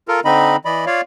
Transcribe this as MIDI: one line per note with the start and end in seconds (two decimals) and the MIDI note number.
0.08 0.20 65
0.08 0.20 69
0.08 0.20 70
0.25 0.56 50
0.25 0.56 60
0.25 0.56 63
0.25 0.56 75
0.25 0.56 83
0.65 0.85 52
0.65 0.85 74
0.65 0.85 75
0.65 0.85 83
0.86 1.01 65
0.86 1.01 73
0.86 1.01 74
0.86 1.01 77